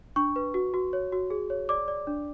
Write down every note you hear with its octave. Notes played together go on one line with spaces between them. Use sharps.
D4 C#6
B4
F#4
F#4
C#5
F#4
G#4
C#5
D5 D6
D5
D4